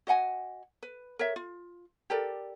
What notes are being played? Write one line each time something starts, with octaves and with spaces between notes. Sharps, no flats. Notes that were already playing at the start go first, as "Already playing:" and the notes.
F#4 D#5 F#5 G#5
B4
A#4 C#5 E5
F4
G4 A4 A#4 D5